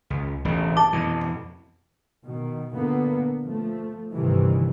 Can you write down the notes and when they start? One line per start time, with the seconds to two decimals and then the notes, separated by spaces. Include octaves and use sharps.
0.10 C#2
0.45 E1 A1 C#3
0.77 A5 D6
0.93 F2 B2 E3
2.25 B2 D#3
2.74 A#2 D3 A#3 B3
3.42 F3 A3
4.13 G1 G2 C3 D#3 E3